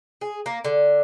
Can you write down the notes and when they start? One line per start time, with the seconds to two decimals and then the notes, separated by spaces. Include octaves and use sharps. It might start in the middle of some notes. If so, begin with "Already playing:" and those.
0.21 G#4
0.46 A#3
0.64 D3